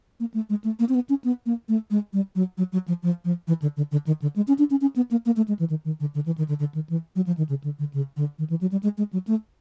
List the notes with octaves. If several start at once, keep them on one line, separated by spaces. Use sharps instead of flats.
A#3
A3
G#3
A3
A#3
C4
B3
C#4
B3
A#3
A3
G#3
G3
F#3
F#3
F#3
F3
F3
F3
E3
D3
D3
D3
D#3
D3
G#3
C#4
D4
C#4
C#4
B3
A#3
A#3
A3
G#3
E3
D#3
D#3
D3
D3
E3
D#3
D3
D3
D#3
E3
F#3
F3
D#3
C#3
D3
D3
C#3
D3
D#3
E3
F#3
G3
G#3
G#3
F#3
A3